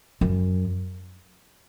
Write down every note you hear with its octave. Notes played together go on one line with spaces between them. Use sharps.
F#2